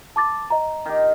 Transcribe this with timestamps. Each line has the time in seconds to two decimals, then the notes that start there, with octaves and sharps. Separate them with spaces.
0.16 A5 D6 A6
0.50 D#5 A#5
0.86 D#3 G4